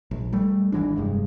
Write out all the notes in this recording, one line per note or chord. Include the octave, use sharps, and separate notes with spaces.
A#1
G3 A3
G#1 G#2 E3 D4
F1 G2 G#3